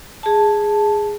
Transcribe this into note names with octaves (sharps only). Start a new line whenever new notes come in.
G#4 A5